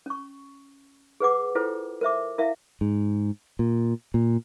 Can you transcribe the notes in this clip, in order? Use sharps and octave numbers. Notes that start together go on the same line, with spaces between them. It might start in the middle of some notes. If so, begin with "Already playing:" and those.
C#4 C#6
G#4 B4 F#5 D6
E4 F4 A4 A#4 C5 G5
A#4 C5 E5 D6
E4 A#4 E5 F5
G#2
A#2
A#2